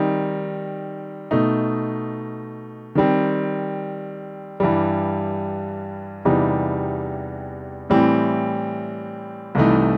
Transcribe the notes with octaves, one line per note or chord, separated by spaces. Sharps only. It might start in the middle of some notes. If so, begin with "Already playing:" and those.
Already playing: D#3 G3 C4 D#4
B2 A3 D#4
D#3 G3 C4
G2 E3 G3
E2 C3 E3 G3 D#4
A2 E3 G3 C4
C2 C3 E3 A3 D#4